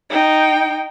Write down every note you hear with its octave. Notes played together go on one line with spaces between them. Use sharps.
D#4 G5